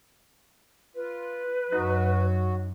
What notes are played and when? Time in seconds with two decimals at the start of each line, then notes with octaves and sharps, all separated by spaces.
0.95 F4 B4
1.72 F#2 F#3 D#4 F#4